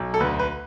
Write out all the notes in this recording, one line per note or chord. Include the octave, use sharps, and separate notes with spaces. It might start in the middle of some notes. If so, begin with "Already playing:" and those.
Already playing: B1
A4
D2 B4
B4